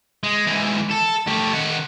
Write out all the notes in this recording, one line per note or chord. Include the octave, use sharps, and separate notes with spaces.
G#3
G#2 E3
A4
A3 G4
D#3 F#5